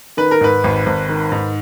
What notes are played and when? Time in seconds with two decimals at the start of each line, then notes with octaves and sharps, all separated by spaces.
0.17 D#3 B4
0.31 A#4
0.41 G#2 B4
0.64 G#1
0.86 G#1
1.09 D#3
1.32 G#2